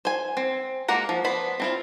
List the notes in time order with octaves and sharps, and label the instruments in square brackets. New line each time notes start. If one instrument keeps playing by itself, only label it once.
[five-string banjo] C5 G#5
C4
G#3 A#3 A#4 F#5 A#5
F3
B3 C5 B5
C4 E4 F4